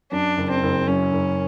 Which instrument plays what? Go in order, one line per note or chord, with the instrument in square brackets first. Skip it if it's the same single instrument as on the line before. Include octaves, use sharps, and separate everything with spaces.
[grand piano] F#2 [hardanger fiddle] D4
[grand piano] F#1
[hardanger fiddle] C4
[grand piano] F#1
[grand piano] F#2 [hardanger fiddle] C#4
[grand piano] F#1